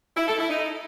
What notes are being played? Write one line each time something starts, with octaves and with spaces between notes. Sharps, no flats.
E4
A4
E4
D#4